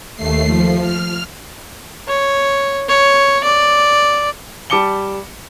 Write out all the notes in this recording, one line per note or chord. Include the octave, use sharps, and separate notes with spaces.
D#2 A3 C7
F3
F6
C#5
C#5
D5
G3 A5 D6 C#7 G7